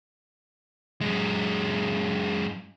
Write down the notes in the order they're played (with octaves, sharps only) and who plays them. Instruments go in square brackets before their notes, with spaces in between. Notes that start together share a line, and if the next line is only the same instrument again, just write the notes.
[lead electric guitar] F#2 G#3